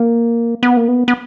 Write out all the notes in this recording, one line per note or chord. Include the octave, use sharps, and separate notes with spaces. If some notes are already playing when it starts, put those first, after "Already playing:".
Already playing: A#3
B3
A#3
B3
B3